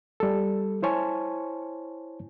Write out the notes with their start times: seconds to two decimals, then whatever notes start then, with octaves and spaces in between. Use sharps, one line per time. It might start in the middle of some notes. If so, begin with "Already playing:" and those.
0.20 G3 A4
0.83 E4 C5 C#5 G#5 A5